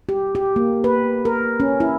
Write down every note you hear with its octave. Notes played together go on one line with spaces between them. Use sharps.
G4
G4
A#3
B4
A#4
C#4
E4